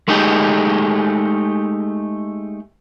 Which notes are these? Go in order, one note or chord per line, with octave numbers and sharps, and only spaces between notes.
G#3 A3 D#4 G4 G#4